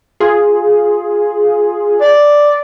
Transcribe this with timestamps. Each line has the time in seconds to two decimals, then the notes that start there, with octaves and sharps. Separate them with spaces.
0.20 F4 G#4
2.01 D5